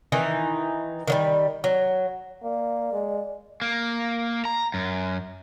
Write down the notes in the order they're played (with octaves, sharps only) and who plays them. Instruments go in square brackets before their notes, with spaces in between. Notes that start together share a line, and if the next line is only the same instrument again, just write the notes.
[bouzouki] D#3 E3 D#4
D#3 F#3 G3
F#3
[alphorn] A#3 [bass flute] D5
[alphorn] G#3
[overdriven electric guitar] A#3
A#5
F#2